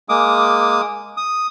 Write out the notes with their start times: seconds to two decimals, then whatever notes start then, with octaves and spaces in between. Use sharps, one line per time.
0.09 G#3 A#3 D6 D#6
1.17 D#6